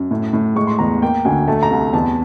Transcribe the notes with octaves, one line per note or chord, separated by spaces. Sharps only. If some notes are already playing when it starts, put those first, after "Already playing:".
Already playing: F#2
A2
A2
G#3 C#6
C6
E2 A#5
A#3 G5
D2 G#5
A3 A5
A#5
C2
E2 A5